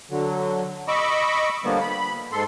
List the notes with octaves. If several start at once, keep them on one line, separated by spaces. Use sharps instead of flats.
D3 F#3
D#5 B5 C#6 D6 E6
D3 F3 G3 A#3 B3
B5
G#2 A4 C6